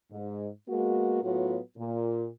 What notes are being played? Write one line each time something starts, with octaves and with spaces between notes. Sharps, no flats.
G#2
G#3 A#3 B3 F#4
A2 F#3 B3 F4 F#4
A#2